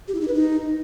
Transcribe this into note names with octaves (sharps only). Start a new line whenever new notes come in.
G4
E4
D#4
B4
D#4